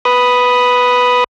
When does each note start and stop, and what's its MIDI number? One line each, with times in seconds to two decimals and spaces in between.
0.05 1.24 71
0.05 1.24 83
0.05 1.24 87